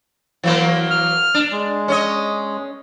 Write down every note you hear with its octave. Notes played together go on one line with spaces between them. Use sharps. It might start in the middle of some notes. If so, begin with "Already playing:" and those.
E3 F#3 A#3
F6
D4
G#3
C#4 C#5 D#5